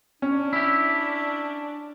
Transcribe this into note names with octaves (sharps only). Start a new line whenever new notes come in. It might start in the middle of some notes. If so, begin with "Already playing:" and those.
C#4 D4
E4 G4